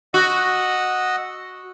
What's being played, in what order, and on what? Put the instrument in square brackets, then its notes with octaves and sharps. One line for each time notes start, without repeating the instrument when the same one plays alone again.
[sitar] F#4 [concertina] D#5 F#5 E6